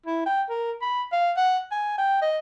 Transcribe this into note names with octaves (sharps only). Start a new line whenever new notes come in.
E4
G5
A#4
B5
F5
F#5
G#5
G5
D#5